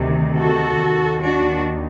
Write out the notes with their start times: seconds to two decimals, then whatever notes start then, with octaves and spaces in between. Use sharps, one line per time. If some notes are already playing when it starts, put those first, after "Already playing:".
Already playing: D2 C3 D#3
0.37 F#4 A4
0.81 D#2 D#3
1.23 D4 F#4